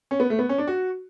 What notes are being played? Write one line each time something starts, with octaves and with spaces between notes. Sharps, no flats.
C#4
B3
A3
B3
C#4
D4
F#4